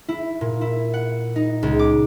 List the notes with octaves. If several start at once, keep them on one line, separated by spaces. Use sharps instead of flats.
E4
A#2
E4
F#5
D#4
C#2
D6